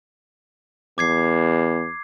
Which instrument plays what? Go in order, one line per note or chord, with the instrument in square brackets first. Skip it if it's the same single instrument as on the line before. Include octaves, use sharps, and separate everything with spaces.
[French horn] E2 [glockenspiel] D6 G#6 C7